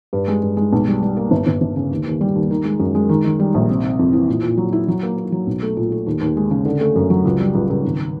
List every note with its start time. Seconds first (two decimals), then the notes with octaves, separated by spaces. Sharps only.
0.13 G2
0.28 G#3
0.42 G2
0.57 G#3
0.73 B1
0.88 G3
1.02 G3
1.17 A#3
1.31 G1
1.47 G1
1.61 G1
1.76 C#3
1.91 D#2
2.06 D#2
2.21 G3
2.35 D#2
2.51 D#3
2.65 G#3
2.80 F#2
2.95 G#3
3.09 D#3
3.24 D#3
3.40 G3
3.54 A#1
3.69 C3
3.84 C3
3.99 F2
4.13 E3
4.28 A#2
4.43 A#2
4.57 F#3
4.73 E4
4.88 F#3
5.03 A#3
5.17 A#3
5.32 F#3
5.47 B1
5.62 A3
5.77 A#2
5.92 A3
6.07 D#2
6.21 D#2
6.37 G#3
6.51 C#3
6.65 D3
6.81 A3
6.96 F#2
7.10 F#3
7.25 C#2
7.40 G3
7.55 C#2
7.70 C#2
7.85 G#1